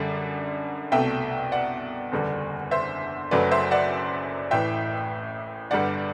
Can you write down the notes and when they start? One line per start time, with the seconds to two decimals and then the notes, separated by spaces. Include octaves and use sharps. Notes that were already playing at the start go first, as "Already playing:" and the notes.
Already playing: F#2 D3 G3 D5
0.92 C2 B2 A3 E5 G5
1.52 D5 F#5
2.12 F#1 E2 D3 G3
2.71 C5 E5
3.31 F#1 F#2 F#3 A3 B4 D5
3.51 C5 E5
3.71 D5 F#5
4.51 A1 A2 E3 E5 G5
5.71 G1 G2 D3 G3 D5 F#5